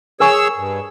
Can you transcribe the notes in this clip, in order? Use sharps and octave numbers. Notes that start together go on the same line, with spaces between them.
G#4 A#4 C#5 G#5 C#6 E6
G2